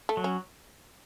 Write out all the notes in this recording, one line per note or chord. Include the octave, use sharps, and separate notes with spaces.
A3
F#3
C#4